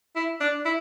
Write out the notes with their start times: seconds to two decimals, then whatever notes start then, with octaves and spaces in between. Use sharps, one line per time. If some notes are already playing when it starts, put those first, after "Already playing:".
0.16 E4
0.41 D4
0.65 E4